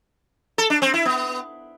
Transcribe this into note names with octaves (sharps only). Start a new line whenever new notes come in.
A4
D4
C4
E4
B3